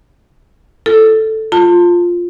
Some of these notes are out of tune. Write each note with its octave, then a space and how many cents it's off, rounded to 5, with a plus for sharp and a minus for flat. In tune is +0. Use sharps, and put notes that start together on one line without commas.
F4 -40 A4 +0
F4 +0 A5 +30